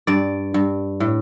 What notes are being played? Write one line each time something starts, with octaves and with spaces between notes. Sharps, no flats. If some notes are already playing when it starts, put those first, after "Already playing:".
G2 D5
G2
A2